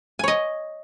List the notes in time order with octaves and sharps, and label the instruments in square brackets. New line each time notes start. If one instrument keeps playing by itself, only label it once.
[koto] G#5
C#5
D#5